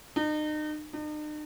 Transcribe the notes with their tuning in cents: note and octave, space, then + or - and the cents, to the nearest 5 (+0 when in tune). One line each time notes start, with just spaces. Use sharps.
D#4 -35
D#4 -45